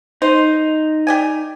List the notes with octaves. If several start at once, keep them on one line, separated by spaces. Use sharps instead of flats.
D#4 C5
G4 D5 G#5